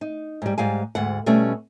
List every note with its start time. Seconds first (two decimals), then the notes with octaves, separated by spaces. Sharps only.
0.01 D#4
0.42 G#2 G3
0.58 G#2 G3 F5 G#5
0.95 D2 G#2 F#5
1.26 B2 G3 A3 C#4